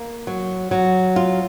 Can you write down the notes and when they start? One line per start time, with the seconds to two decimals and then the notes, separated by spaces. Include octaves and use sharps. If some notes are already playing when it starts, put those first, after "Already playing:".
Already playing: A#3
0.27 F#3
0.71 F#3
1.16 F4